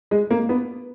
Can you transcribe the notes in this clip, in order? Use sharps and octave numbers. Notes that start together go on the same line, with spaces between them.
G#3
A#3
B3